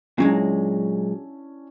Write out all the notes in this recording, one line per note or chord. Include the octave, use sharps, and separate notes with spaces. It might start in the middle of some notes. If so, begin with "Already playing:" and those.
A#2 F#3 G#3 C#4 D4 E4